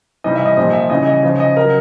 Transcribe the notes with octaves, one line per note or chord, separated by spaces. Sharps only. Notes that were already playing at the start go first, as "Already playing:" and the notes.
C3 E3 G3 D#5
E5
D#5
A#2 F3 D#5
E5
C#3 E3 G3 D#5
D#5
C#3 F3
D#5
C#3 F#3 A#4